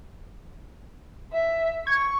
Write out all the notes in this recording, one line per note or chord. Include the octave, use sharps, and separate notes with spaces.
E5
C#6 G#6